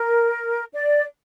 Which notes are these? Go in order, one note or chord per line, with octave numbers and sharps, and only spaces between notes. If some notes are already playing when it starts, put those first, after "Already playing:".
Already playing: A#4
D5